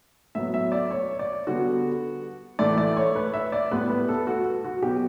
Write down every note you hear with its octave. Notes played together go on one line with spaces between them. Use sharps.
A2 F#3 B3 E5
E5
D5
C#5
D5
D3 G3 B3 F#4
A2 E3 A3 D5
D5
C#5
B4
E5
D5
A2 G3 B3 B4
B4
A4
F#4
F#4
B2 F#3 B3 G4